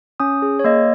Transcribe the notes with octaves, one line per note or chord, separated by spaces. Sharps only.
C#4 D#6
G#4
C#5
A#3 D#5